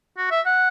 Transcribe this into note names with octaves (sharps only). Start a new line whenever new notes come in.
F#4
E5
F#5